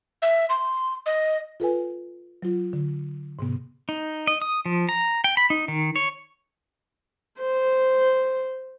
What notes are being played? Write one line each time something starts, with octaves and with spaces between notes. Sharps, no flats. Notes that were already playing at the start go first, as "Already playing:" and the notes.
E5
C6
D#5
F4 A4 B4 G#5
F#3 F4
D3
G#2 C3 B3
D#4
D#5
D#6
F3
A#5
G5
B5
D#4
D#3
C#5
C5